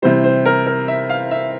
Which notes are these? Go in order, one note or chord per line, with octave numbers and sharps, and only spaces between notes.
C3 E3 G3 C5
C5
A#4
A#4
E5
F5
E5